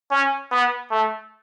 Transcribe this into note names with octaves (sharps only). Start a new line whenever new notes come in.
C#4
B3
A3